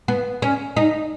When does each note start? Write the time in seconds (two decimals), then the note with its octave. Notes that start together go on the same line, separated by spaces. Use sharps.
0.08 B3
0.42 C#4
0.76 D#4